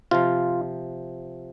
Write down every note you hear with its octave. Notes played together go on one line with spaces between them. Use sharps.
C3 F3 F4